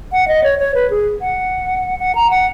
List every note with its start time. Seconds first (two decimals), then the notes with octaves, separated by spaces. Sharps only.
0.12 F#5
0.28 D#5
0.43 C#5
0.59 C#5
0.74 B4
0.90 G#4
1.21 F#5
1.99 F#5
2.15 A#5
2.30 F#5